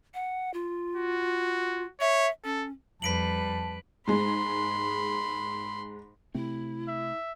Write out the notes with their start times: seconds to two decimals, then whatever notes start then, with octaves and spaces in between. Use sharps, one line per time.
0.14 F#5
0.54 F4
0.96 F#4
2.01 C#5 E5
2.44 C#4 A4
3.02 F2 G3 B4 A5 B6 D7 F#7
4.07 G#2 G#3 B5 C6
6.35 C3 A3 C4 E4
6.88 E5